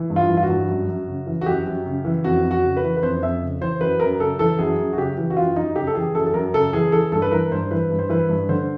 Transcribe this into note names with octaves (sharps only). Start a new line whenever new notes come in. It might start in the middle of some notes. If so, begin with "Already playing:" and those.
Already playing: E3
G2
F4
E3
F4
F#4
G2
F#2
F#2
C#3
E3
F#4
F#2 G4
F#2
C#3
E3
F2 F#4
F2
F#4
C#3
B4
E3
B4
F2 C5
F2 E5
C#3
E3 C5
F#2 B4
F#2 A#4
C#3 A4
E3 A4
F#2 G#4
F#2
F#4
C#3 G4
E3
F#4
F#2 F4
F#2 D#4
C#3 G4
A4
E3 G#4
F#2 A4
A4
F#2 A#4
C#3 A4
E3 G#4
E3 A4
G2 A4
B4
E3 A#4
G2 C5
E3 B4
G2
C5
E3 B4
G2
D3 C5